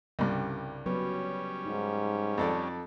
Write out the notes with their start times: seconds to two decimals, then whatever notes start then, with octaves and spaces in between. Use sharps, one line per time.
0.19 C2 G2 C#3 G3
0.86 F#3 G3 B3 C#4 B4
1.66 G#2 D#4
2.38 F2 A4 D5